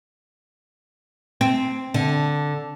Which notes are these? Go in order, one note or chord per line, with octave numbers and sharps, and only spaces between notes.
C4
D3